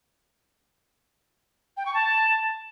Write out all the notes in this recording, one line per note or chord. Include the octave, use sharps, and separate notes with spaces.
G5
C#6
A5